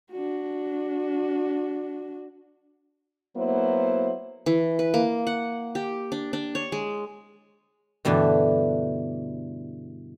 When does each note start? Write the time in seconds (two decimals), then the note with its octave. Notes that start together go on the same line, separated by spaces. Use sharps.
0.12 D4 F#4
3.37 F#3 A#3 B3 E4 C5
4.46 E3
4.79 B4
4.94 A#3
5.27 F#5
5.75 G4
6.12 D4
6.33 D4
6.55 C#5
6.72 G#3
8.05 G2 B2 D3 E3 A3